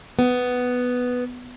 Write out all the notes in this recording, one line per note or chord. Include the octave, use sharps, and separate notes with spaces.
B3